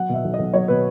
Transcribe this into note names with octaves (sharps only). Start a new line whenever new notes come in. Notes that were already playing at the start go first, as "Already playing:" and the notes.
Already playing: F#3 F#5
B2 E5
B1
D#5
B1
F#3 C#5
B2 B4